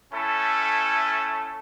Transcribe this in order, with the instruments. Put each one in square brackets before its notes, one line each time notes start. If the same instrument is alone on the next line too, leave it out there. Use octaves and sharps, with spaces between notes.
[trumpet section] A3 C#4 E4 A4